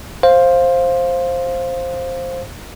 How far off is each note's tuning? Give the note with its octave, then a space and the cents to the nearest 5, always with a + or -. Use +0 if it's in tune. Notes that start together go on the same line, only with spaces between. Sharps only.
C5 +10 F5 +0